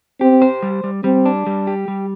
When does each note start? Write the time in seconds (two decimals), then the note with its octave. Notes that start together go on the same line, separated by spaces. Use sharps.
0.21 C4 G4
0.42 C5
0.63 G3
0.84 G3
1.04 G3 C4
1.25 D4
1.47 G3
1.67 G4
1.88 G3